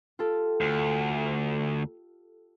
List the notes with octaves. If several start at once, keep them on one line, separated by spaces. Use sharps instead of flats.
F4 G4 A4
D2